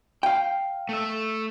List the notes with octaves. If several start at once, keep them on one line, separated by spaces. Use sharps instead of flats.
F5 G5
A3 E5